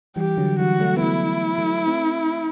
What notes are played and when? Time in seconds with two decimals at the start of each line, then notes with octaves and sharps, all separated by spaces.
0.16 E3 G3 G4
0.38 D3 F#3
0.59 E3 G3 F#4
0.80 F#3 A3
0.97 B3
1.01 F#3 A3 E4
1.58 F#3 A3
1.87 A3 C4